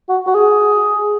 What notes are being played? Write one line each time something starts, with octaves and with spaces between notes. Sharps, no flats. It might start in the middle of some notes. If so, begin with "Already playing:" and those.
F#4
F#4
G#4